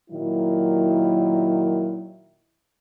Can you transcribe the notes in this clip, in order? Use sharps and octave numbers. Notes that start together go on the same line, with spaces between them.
A#2 D#3 F#3 E4